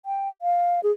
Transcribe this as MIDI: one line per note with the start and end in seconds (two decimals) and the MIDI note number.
0.06 0.29 79
0.42 0.80 77
0.83 0.91 68